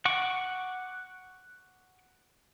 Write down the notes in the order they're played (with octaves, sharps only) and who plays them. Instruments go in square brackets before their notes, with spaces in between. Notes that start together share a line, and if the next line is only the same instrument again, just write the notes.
[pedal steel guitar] F#5 C#6 D6